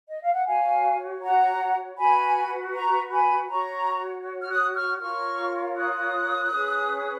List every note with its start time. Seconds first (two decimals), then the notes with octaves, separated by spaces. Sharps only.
0.10 D#5
0.22 F5
0.34 F#5
0.45 F#4 C#5 F5 G#5
1.22 F#5 A#5
1.97 F#4 B4 G#5 B5
2.73 A#5 C#6
3.10 G#5 B5
3.49 F#4 C#5 A#5 C#6
4.41 F6
4.50 D#6 F#6
4.74 C#6 F6
5.00 F4 A#4 C#5 C#6 F6
5.76 D#6 F#6
6.52 C#4 G#4 B4